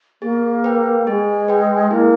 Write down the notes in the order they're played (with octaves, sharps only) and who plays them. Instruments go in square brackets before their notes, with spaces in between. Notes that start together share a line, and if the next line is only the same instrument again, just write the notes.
[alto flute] A#3 [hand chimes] G#4
[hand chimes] B4 G5
[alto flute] G#3 [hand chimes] G#4
[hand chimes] B4 G5
[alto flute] A#3 [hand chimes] E4